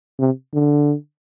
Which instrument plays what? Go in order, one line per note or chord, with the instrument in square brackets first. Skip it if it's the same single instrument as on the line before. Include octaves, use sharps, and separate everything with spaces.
[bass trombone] C3
D3